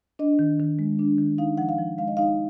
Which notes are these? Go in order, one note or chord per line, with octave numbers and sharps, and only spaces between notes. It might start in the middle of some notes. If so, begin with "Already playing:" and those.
D4 D#5
D#3
D#3
G#3
D4
D#3
D#4 F5
F3 F#5
F5
F3
G#3 F5
D#5
D#4 F5